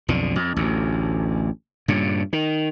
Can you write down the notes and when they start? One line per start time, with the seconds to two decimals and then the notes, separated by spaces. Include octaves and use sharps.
0.08 B1 F2 D3
0.36 F2
0.56 A1 D2
1.88 G2 A#2 C#3
2.33 D#3